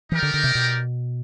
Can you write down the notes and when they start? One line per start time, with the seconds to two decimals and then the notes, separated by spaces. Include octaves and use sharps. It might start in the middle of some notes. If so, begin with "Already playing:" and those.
0.11 E3 D#4 G4 A#4 D5 G5
0.23 D3
0.34 D3
0.44 C3
0.55 B2